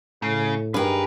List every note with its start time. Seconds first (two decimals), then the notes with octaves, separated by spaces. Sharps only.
0.22 A2 C#3
0.74 G2 D#3 G#4 A#4 B4